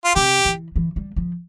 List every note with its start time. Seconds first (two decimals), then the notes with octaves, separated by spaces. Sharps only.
0.04 F4
0.15 C3 G4
0.45 E3
0.76 E3
0.96 G3
1.16 F3